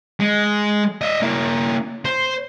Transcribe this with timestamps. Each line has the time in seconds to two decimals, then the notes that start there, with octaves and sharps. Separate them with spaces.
0.20 G#3
1.01 D#5 E5
1.22 A#3 E4
2.05 C5